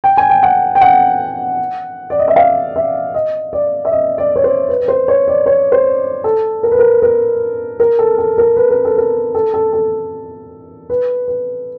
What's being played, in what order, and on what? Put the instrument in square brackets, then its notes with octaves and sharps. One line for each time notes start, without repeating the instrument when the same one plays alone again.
[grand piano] G5
G#5
G5
F#5
G5
F#5
D5
D#5
E5
F5
E5
D#5
D5
E5
D#5
D5
C#5
C5
B4
B4
C5
C#5
D5
C#5
C5
A4
A#4
B4
A#4
A#4
A#4
A4
A4
A#4
B4
A#4
A4
A#4
A4
A4
A4
B4
B4